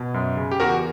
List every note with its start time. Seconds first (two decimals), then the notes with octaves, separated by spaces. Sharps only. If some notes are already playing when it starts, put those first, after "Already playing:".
Already playing: B2
0.14 F#2
0.37 C#3
0.51 G4
0.60 E2 F#4 A#4